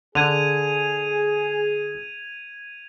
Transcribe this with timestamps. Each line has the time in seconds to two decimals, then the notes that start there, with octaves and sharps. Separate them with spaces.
0.15 D3 G#4 G#6 D#7 F7